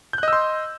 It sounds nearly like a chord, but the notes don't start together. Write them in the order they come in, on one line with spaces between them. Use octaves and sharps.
G6 F#6 D#5 E6 C6